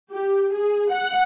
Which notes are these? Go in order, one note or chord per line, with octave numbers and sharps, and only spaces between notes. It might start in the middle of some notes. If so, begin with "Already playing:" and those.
G4
G#4
F#5